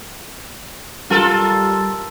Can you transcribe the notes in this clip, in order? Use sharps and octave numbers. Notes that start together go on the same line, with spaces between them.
G3 F4 A4 A#4